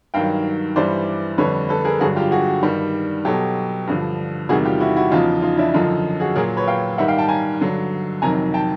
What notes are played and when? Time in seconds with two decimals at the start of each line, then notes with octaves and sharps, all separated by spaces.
0.14 G2 D#3 F#3 F5 G5
0.76 G2 E3 G3 C5 D5
1.38 F2 D3 G3 B4 C#5
1.69 A4 B4
1.85 G#4 A#4
2.00 G2 D3 F#3 F#4 G#4
2.16 F4 G4
2.31 F#4 G#4
2.63 G2 D#3 G3
3.25 B2 F#3 G4 A4
3.87 G2 D3 F3
4.49 E2 C3 D#3 G3 F#4 G#4
4.65 F4 G4
4.80 E4 F#4
4.96 E4 F#4
5.11 E2 C#3 F3 D#4 F4
5.42 D#4 F4
5.58 D4 E4
5.74 F#2 D3 F3 D#4 F4
6.20 F#4 G#4
6.35 A#2 F#3 G#4 A#4
6.57 B4 C#5
6.68 F5 G5
6.98 G#2 D#3 G3 E5 F#5
7.08 F5 G5
7.18 G5 A5
7.29 G#5 A#5
7.61 G2 D3 F#3
8.22 F2 C3 D#3 F#3 G#5 A#5
8.54 G5 A5